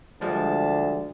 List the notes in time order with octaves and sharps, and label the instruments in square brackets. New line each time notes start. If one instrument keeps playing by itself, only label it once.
[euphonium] D2 [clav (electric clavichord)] F3 G3 G#3 [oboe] A5